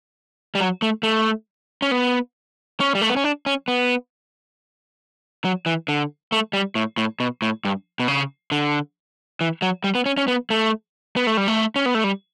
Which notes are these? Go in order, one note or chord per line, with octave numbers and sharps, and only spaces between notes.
G3
F#3
A3
A3
C#4
B3
C#4
G3
A3
B3
C#4
D4
C#4
B3
F#3
E3
D3
A3
G3
A2
A2
B2
A2
G2
B2
C#3
D3
E3
F#3
G3
B3
C#4
C#4
B3
A3
B3
A3
G3
A3
C#4
B3
A3
G3